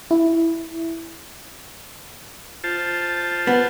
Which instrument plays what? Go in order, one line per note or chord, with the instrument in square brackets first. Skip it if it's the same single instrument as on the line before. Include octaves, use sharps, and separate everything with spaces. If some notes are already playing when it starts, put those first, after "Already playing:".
[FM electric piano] E4
[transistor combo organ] F4 C5 A5
[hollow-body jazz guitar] B3